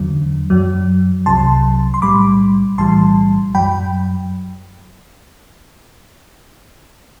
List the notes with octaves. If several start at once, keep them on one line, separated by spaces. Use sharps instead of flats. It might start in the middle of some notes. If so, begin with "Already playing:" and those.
Already playing: E2 D3 F#3
F#2 F#3
C2 C3 F#3 A5 C6
C6
B1 A2 G3 B5 D6
B1 A2 E3 G3 A5 C6
F#2 F#3 G5 B5